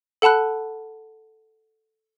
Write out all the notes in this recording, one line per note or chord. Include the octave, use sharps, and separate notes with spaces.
A4 F#5 A5 B5 F#6